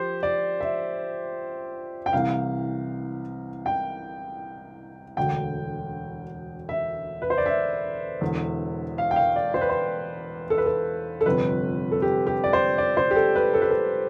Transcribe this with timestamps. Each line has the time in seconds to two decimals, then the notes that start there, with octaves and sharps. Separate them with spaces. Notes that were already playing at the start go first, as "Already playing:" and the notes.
Already playing: F3 G4 C5
0.23 D5
0.60 E5
2.06 G5
2.13 C2 C3 E3 F5
3.66 G5
5.17 E1 D2 D3 G5
6.69 E5
7.22 B4
7.30 C5
7.38 D5
7.46 E5
8.21 E1 E2 D3
8.98 F5
9.11 G5
9.16 F5
9.36 D5
9.54 C5
9.61 B4
9.69 C5
10.50 A4
10.58 B4
10.66 A4
11.21 A4
11.26 G1 F2 C3 F3 B4
11.91 A4
12.02 G4
12.27 G4
12.44 D5
12.53 C5
12.78 D5
12.97 C5
13.11 G4
13.16 A4
13.36 B4
13.54 A4
13.62 B4
13.71 A4